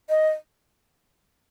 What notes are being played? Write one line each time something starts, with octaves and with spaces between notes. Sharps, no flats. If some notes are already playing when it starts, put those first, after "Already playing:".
D#5